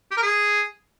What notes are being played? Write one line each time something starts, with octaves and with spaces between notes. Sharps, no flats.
G4
A#4
G#4